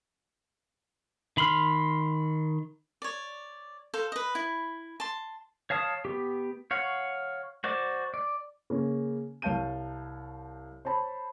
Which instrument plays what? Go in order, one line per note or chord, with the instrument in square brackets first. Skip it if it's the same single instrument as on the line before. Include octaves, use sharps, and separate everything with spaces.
[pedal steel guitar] D#3 B5 C6 F6
[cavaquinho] C#5 D5
A4 C5 F5
B4 D#5
E4 B5
A5 C6
[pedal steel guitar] C#5 F5 A5 D#6
B3 G4
C#5 F5 F#5
F#4 C5 D5 D6
D5
[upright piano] C#3 A#3 C#4
C2 C#5 F5 A5 G6 D#7
C5 C#5 A5 B5